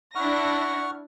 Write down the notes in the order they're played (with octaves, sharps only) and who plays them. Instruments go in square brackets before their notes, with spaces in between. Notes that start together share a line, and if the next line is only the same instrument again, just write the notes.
[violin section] D4 E4 A#6 [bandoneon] F#5 C#6 F6